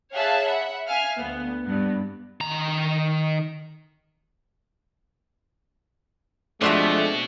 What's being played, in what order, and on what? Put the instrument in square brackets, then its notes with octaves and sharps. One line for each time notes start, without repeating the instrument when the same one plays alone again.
[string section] G#4 C#5 E5 F5 A5 F#6
E5 F#5 B5
E5 F5 G#5 F6
D2 B3
G2 B3
[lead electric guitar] D#3 A#5
[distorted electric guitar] B2 [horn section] F3 G#3 A3 [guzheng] C4 F#4 E5 [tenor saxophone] D4